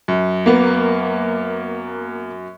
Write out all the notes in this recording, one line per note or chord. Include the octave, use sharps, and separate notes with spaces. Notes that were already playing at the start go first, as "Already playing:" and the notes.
F#2
A#3 B3